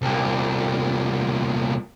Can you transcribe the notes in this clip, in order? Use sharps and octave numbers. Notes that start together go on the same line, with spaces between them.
C2 A#2